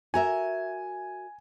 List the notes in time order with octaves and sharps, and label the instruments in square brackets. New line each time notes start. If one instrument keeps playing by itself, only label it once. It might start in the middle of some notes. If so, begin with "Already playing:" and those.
[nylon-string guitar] F#4 A#4 E5 [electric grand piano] G#5